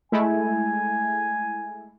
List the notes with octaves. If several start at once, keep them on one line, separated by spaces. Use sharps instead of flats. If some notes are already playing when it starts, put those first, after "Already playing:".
G#3 A3 E4 G#5